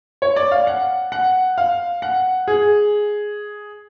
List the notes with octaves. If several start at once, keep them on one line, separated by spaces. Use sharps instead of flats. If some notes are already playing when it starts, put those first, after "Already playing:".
C#5
D5
F5
F#5
F#5
F5
F#5
G#4